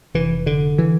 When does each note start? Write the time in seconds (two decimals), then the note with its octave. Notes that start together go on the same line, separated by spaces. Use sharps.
0.14 F1 E3
0.46 D3
0.78 E3